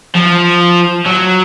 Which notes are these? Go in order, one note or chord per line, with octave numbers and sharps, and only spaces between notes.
F3
F#3